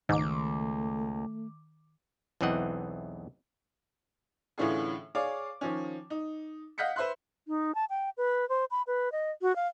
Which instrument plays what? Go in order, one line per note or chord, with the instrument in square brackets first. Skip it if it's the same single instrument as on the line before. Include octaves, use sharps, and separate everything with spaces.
[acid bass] C#2 [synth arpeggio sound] G#2 [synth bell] D#3 D6 [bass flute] A3
[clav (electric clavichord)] B1 E2 E3 C4 D#5 F#5
[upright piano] A2 D3 E3 C#4 F4 G#4
G#4 C#5 D5 F5 D6
D#3 F3 C#4
D#4
D#5 F5 F#5 G6 B6 C#7
B4 C5 E5 C6 F#6
[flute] D#4
A5
G5
B4
C5
B5
B4
D#5
F#4
F5